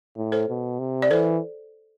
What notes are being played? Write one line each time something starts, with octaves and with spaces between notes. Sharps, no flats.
A2
A4 C5
B2
C3
D5
E3 A4 C5